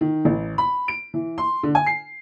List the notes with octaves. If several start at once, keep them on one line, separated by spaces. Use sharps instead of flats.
D#3
A1
B5
D7
E3
C6
D3
G#5
C7